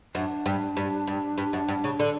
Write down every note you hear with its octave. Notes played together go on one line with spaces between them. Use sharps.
F#2 D4
G2
G2
G2
G2
F#2
G2
C#3
D3